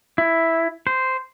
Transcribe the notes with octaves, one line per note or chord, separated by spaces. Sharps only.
E4
C5